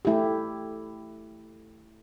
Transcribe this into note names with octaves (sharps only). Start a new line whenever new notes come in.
A3 E4 G4